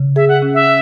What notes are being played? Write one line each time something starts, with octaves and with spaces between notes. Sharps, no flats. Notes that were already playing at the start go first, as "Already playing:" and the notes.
Already playing: C#3
G#4 E5
F#5
C#4
E5